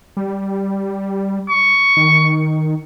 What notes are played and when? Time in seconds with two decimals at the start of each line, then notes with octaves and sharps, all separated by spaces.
0.17 G3
1.50 C#6
1.97 D#3